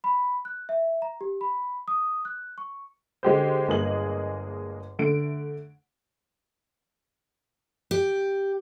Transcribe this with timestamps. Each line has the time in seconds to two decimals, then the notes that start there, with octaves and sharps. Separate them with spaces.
0.04 B5
0.45 F#6
0.69 E5
1.02 A#5
1.21 G4
1.41 B5
1.88 D#6
2.25 F#6
2.58 C#6
3.23 D3 G#3 G4 C5
3.68 G1 G#3 A#3 G#4 D#5 F#7
4.99 D3 A3 D7
7.91 G4